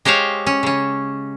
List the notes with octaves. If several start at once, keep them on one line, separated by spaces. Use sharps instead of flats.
G#3 G4 C5 C#5 F5
C#4
C#3 C#4